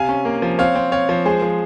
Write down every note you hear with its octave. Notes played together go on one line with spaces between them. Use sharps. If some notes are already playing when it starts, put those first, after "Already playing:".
Already playing: C3 F5 G#5
C#4
A#3
F3
C4 C#5 F5
C4
C4 C#5 F5
F3
G#3 G#4 C5
F3